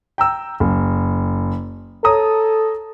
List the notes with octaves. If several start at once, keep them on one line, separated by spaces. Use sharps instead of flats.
G5 A#5 E6
F#1
A4 C#5 A#5 D#6